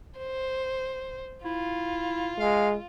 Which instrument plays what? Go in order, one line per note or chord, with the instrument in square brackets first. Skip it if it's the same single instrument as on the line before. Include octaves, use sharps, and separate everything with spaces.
[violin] C5
[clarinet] E4 [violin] F4
[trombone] G#3 [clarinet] F5